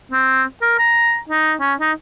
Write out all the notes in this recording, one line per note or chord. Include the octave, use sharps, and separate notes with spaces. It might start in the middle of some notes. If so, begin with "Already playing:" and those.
C4
A#4
A#5
D#4
C#4
D#4